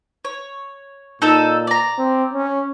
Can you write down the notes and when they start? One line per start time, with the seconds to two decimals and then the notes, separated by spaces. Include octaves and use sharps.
0.25 C#5
1.22 A#2 D#4 A4 E6
1.67 D5 A#5
1.98 C4
2.33 C#4